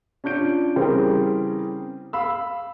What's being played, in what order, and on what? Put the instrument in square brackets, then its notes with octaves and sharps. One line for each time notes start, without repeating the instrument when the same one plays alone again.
[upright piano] C#4 D4 F4 G6 D7
C#3 E3 G3 C4 G#4 A#4
F5 B5 E6